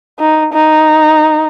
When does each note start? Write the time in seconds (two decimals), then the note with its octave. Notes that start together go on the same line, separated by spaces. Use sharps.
0.19 D#4
0.53 D#4